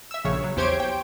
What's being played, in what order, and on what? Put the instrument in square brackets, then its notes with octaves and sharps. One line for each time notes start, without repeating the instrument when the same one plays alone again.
[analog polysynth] E5 E6
A#1 C#3 C#5
F#3
E2 G4 C5 C#5 G#6 D7
G5